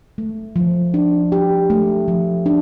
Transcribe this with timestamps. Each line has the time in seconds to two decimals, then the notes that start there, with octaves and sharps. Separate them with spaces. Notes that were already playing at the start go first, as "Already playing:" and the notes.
0.18 A3
0.56 F3
0.94 D4
1.32 G4
1.70 A3
2.08 F3
2.46 D4